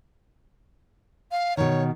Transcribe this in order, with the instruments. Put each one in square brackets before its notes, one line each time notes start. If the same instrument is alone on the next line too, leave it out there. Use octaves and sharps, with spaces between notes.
[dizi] F5
[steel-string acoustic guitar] B2 D#3 [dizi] C#5